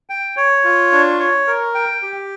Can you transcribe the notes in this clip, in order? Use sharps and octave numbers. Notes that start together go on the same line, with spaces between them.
G5
C#5
F4
D4
C#5
A#4
G5
G4